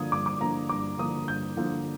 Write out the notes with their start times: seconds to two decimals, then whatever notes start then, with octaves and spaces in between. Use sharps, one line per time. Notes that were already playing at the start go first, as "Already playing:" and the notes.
Already playing: G2 D3 F3 A#3 D#6 G#6
0.12 G2 D6
0.26 D6
0.41 D3 F3 A#3 A#5
0.69 G2 D6
0.98 D3 F3 A#3 D#6
1.28 G2 G6
1.57 D3 F3 A#3